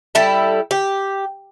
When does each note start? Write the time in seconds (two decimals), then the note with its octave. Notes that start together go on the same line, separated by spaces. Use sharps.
0.15 G3 E4 A4
0.71 G4